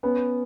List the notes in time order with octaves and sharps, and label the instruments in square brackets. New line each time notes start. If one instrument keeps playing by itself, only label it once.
[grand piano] B3 C#4